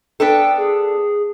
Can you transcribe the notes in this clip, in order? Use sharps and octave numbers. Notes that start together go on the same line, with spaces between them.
B3 D4 A4 G5
G#4